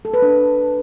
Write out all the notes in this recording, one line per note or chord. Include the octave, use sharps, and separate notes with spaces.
A4
B4
D4